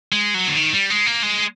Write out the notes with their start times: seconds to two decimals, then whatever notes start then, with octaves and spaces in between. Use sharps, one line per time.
0.13 G#3
0.34 F#3
0.48 D3
0.57 D#3
0.73 G3
0.90 G#3
1.06 A#3
1.23 G#3